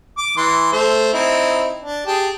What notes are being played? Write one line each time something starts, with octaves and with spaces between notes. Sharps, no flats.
D6
E3 C6
A3 C5
C4 D#4 E4
D4
G4 G#4 A5